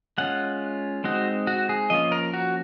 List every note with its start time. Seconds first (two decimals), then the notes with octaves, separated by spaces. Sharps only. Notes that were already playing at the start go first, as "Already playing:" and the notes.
0.18 G#3 C#4 F4 F#5
1.04 G#3 C4 D#4 F#4
1.47 F#4
1.69 G#4
1.90 F3 A#3 C#4 F4 D#5
2.12 A#4
2.34 F#4